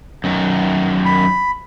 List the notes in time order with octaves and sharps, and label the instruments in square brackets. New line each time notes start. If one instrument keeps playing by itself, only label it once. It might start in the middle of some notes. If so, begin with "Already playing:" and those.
[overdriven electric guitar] F#2 D#3
[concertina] B5